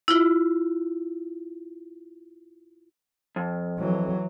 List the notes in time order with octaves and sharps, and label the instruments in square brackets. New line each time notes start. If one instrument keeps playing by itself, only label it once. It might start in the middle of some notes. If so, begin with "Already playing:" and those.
[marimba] E4 F4
[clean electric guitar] F2
[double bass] E3 F#3